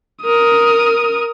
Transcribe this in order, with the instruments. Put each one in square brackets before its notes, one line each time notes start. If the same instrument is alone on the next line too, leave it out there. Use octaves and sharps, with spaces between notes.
[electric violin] A#4 D#6